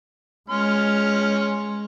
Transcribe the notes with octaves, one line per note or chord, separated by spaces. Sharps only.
G#3 C#4 C6 F6